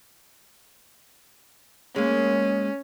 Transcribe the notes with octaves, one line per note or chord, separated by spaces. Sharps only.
G#3 A#3 C#4